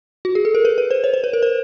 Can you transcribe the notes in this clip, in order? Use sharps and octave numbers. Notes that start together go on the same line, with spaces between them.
F#4
G#4
A4
A#4
B4
B4
C5
C#5
C5
B4
A#4
C5